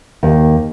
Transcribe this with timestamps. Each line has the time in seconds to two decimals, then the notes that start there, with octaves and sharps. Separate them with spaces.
0.23 D#2